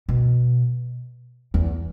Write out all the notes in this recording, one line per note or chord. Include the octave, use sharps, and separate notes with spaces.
B2
E2